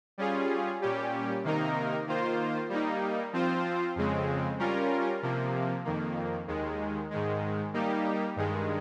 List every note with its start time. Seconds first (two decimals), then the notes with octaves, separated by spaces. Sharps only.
0.18 G3 C#4 F4 G#4
0.82 A#2 G3 C#4 G4
1.44 C3 D#3 A#3 D#4 A#4
2.07 D#3 A#3 F4 C5
2.69 G3 A#3 D#4
3.33 F3 C4 F4 C5
3.96 F2 C#3 G#3 C4
4.59 G3 C#4 F4 A#4
5.22 C3 F3 A#3
5.85 F2 D#3 A#3
6.47 D#2 D#3 G#3
7.11 G#2 D#3 G#3
7.74 G3 A#3 D#4 G4
8.36 G2 D#3 G#3